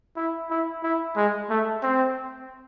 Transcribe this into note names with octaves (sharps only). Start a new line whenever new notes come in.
E4
E4
E4
G#3
A3
C4